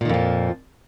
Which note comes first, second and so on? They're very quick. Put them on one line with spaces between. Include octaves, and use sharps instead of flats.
A#2 D#3 F2 F3